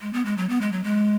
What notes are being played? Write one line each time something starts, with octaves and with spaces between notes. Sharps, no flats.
G#3
B3
G#3
F#3
B3
G#3
F#3
G#3